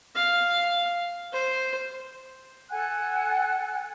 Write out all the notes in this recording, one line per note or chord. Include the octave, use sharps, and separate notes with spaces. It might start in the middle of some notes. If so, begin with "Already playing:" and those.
F5
C5
A4 F#5 G#5 F#6